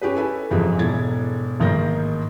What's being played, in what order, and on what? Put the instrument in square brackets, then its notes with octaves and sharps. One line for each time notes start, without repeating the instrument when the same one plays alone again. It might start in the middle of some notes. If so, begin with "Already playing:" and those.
[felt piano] C#4 G4 G#4 B4
E4 A4 B4 G#5
F#1 F2 G#2 E3 G#3 G4
E1 G#2 E4 A4 G#6 A6
A1 G#2 D#3 A#3 G6 A#6